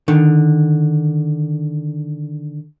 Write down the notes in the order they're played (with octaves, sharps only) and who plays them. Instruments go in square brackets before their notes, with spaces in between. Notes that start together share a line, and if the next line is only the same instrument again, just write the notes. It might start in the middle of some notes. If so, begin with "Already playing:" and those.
[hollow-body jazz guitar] D3 D#3